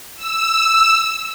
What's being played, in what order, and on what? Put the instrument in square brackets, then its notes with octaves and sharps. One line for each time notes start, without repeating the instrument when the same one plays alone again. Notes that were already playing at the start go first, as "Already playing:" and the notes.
[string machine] E6